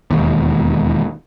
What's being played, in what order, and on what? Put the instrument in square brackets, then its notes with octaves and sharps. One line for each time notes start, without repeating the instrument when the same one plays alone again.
[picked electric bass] E1 D#2